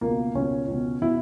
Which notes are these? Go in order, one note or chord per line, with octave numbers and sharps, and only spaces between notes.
C#2 B2 A#3
C#2 B2 C#4
C#2 B2
B2 E4